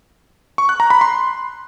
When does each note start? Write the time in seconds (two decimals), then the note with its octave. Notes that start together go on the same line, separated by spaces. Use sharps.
0.58 C#6
0.69 F#6
0.80 A#5
0.90 B5
1.01 C6